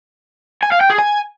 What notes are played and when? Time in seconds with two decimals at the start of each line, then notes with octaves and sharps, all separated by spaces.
0.63 G#5
0.72 F5
0.81 G5
0.90 G#4
0.99 G#5